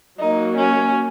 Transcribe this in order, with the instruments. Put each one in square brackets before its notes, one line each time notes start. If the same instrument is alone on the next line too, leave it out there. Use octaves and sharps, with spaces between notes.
[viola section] F#3 A#3 F#4 [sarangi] D#4
[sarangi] C#4